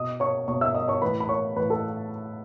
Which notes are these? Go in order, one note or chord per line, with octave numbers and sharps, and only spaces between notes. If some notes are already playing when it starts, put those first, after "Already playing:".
Already playing: B2 D#5 D#6
C#5 C#6
B2 C#5 C#6
E5 E6
D#5 D#6
C#5 C#6
A2 E3 B4 B5
B5
C#5 C#6
A2 E3 B4 B5
A4 A5